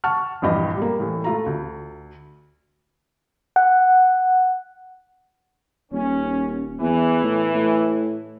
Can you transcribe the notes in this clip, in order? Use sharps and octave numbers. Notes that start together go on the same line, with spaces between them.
F#5 A5 C#6 F6
A#1 E2 G2 G4 D#5
G3 A#3
A2 E3
A3 F4 A#5
D2
F#5
D#1 C#4
E2 E3
A2
A2